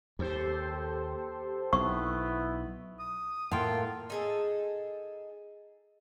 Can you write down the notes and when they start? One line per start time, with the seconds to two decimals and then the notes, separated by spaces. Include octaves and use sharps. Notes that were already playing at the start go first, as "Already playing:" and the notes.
0.19 D#2 G4 A4 C5
1.73 B1 B3 E4 C#6
3.00 D#6
3.51 A2 A#3 F4 F#5 G5 A5 C6
4.10 D#4 G#4 A4